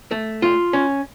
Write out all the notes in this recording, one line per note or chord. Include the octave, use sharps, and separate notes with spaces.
A3
F4
C#4